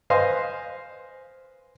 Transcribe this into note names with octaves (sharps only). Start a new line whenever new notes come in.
B4 C5 D#5 F5 G#5 C6